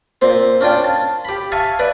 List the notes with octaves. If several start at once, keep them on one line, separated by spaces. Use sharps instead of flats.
A#2 C4 C5
C#4 D4 F4 G5
A5
G4 B5
E5 F5 G#5 A5 C#6
B4 D5 E5